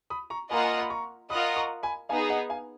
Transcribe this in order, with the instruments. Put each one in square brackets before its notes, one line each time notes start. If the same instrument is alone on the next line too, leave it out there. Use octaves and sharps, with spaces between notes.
[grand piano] B5 D#6
A#5 C#6
[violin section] A#3 F4 A#4 D#5 F#5 [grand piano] G#5 B5
[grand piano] G#5
A#5
B5
A#5 C#6
[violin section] F4 A#4 D#5 F#5 [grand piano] B5 D#6
[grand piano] A#5 C#6
G#5 B5
[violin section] B3 D#4 G#4 [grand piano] F5 G#5
[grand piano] D#5 F#5
F5 G#5